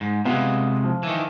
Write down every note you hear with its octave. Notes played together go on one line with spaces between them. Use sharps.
G#2
C3 G#3 B3 F4
F3
D#3 E3